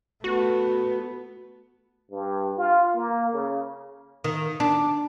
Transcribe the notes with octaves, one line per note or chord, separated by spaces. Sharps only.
A3 B3 F#4
G2
F4
A#3
C#3
D#3
D4